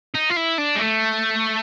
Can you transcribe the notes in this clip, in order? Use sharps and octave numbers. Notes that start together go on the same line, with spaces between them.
D#4
F4
E4
D4
G#3
A3